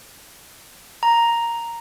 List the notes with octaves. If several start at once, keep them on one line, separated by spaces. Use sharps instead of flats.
A#5